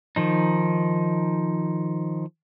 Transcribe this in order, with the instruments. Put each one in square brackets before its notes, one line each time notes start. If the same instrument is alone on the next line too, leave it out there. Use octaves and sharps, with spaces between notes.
[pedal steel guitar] D#3 F3 D#4